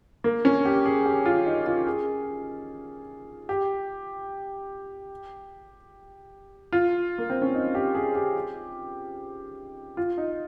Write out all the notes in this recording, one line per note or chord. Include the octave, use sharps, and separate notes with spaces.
A#3
C#4
G4
G#4
G4
F4
D#4
F4
G#4
G4
F4
A#3
C4
C#4
D#4
G4
G#4
G4
F4
D#4